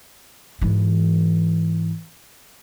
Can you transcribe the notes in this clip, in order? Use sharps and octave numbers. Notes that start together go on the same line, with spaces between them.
G#2 E3